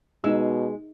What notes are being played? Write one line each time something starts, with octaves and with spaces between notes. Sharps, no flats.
B2 G#3 D#4 E6